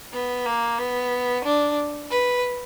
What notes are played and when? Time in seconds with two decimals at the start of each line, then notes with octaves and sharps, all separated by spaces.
0.13 B3
0.45 A#3
0.78 B3
1.44 D4
2.10 B4